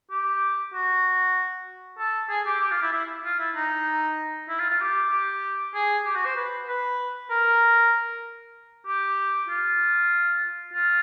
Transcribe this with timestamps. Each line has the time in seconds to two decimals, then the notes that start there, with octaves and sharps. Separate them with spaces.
0.11 G4
0.74 F#4
1.98 A4
2.29 G#4
2.46 G4
2.61 G4
2.71 F4
2.82 E4
2.92 E4
3.24 F4
3.39 E4
3.56 D#4
4.49 E4
4.59 F4
4.70 F4
4.80 G4
5.11 G4
5.74 G#4
6.05 G4
6.15 F#4
6.25 C5
6.36 B4
6.68 B4
7.30 A#4
8.86 G4
9.49 F4
10.73 F4